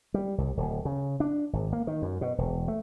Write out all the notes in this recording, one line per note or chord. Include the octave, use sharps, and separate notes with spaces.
G3
C2
D1
C#3
D4
G#1
A#3
D#3
F#2
B2
E1
A3